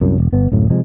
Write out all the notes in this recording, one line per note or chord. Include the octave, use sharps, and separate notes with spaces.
C2 F#2
E1
G1 B3
D1 F#2 A2
C3 F3 G#3